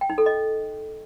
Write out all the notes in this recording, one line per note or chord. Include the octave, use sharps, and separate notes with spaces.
G5
D#4
A4
D#5